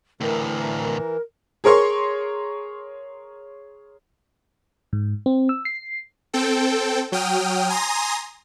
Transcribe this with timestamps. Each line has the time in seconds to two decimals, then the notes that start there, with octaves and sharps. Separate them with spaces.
0.21 D2 A2 E3 A#4
1.64 G#4 A#4 C#5 C6 C#6
4.93 G#2
5.26 C4
5.49 E6
5.65 C7
6.33 C4 A4 G5
7.12 F#3 G5 D#6 F6
7.69 G#5 A#5 C6 D#6 A#6